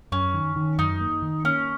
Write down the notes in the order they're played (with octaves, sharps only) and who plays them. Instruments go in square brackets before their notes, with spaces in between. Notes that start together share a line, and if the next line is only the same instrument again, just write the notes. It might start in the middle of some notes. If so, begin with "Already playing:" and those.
[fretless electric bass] F#2 [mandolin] C#4
[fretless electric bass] D#3
D#3
[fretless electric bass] F#2 [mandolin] D#4
[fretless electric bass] A#3
D#3
[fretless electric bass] A#3 [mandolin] C#4